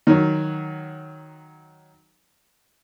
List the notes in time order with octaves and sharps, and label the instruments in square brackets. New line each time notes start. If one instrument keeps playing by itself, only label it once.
[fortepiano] D#3 F#3